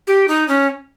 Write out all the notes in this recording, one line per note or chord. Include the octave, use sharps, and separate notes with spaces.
G4
D#4
C#4